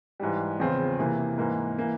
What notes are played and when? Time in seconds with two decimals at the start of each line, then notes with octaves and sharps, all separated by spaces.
0.20 G#2 E3 G3
0.60 E2 C#3 F3 C4 F4
0.99 C3 E3 A#3
1.37 G#2 E3 A#3
1.78 E3 A#3